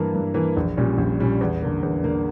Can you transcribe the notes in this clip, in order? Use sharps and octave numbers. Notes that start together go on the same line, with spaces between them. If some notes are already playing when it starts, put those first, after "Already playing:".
Already playing: G2 E3 A#3
G2
E3 A#3
A#1
A#2 G3 C#4
A#1
A#2 G3 C#4
E2
D3 A#3
E2
D3 A#3